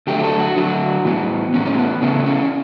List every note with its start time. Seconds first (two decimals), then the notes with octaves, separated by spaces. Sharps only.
0.07 D3 F#3 A3 G4
0.19 G4
0.24 A4
0.40 F#4
0.56 D3 F#3 A3
1.05 A2 E3 B3
1.54 A2 E3 B3 C#4
1.66 C#4
1.79 B3
2.02 C#3 E3 A3 C#4
2.26 C#4